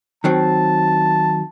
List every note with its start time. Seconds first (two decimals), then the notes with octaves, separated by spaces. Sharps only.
0.24 D#3 F#3 C4 A5